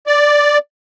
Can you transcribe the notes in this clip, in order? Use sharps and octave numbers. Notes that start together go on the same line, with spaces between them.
D5